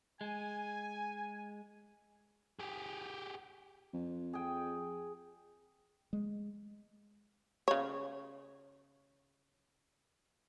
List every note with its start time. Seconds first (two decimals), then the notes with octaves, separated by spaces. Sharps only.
0.21 G#3 G#5
2.60 G4 G#4
3.93 F2
4.33 G#4 G5
6.13 G#3
7.68 C#3 C#5